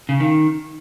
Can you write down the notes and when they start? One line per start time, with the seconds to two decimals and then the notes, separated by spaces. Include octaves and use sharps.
0.09 C#3
0.20 D#3